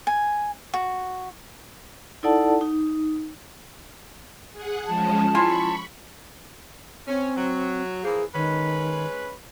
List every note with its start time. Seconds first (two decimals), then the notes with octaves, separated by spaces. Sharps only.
0.07 G#5
0.74 F#4
2.23 D#4 E4 A4 D5 F#5 A5
2.61 D#4
4.52 G#4 F#5
4.87 F3 G#3 C#4 A5
5.35 E4 F4 G#5 B5 C#6
7.08 C4 C#4
7.36 F#3
8.04 E3 F3 A#3 G#4
8.34 D#3 G#3 C#4 B4